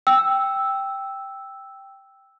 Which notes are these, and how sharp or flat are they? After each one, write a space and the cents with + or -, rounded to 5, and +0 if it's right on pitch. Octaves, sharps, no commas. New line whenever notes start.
G5 +0 E6 +0